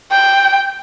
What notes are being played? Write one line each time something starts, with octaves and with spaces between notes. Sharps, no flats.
G5